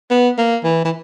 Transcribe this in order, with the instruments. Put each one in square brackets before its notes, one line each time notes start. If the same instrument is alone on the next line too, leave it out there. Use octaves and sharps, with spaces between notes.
[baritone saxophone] B3
A#3
E3
E3